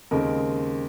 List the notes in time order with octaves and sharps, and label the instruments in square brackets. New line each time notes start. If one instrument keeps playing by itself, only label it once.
[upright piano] D#2 C#3 G#3 C4 A#4